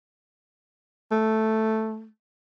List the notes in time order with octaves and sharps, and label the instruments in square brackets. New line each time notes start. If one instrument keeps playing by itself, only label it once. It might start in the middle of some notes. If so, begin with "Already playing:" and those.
[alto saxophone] A3